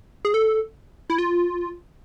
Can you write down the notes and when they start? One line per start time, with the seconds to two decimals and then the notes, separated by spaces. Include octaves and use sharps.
0.25 G#4
0.34 A4
1.10 E4
1.18 F4